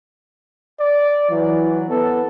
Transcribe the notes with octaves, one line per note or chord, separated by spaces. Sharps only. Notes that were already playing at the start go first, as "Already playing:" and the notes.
D5
E3 F#3
B3 A4